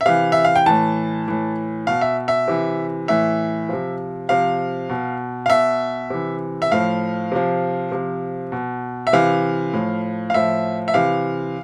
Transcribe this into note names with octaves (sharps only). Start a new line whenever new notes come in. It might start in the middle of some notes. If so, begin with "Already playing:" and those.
E5
C3 E3 F5
E5
F5
G5
A2 E3 A5
A2 E3
B2 F5
E5
E5
C3 E3
A2 E3 E5
C3 F3
C3 F3 F5
B2
F5
B2 E5
C3 E3
E5
A2 F3 F5
C3 F3
C3 F3
B2
E5
C3 E3 F5
A2 F3
F5
A2 F3 E5
E5
C3 E3 F5